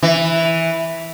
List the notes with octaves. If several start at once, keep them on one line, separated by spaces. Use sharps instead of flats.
E3